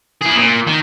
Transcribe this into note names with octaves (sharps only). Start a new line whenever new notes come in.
E4 G#4
A#2
D#3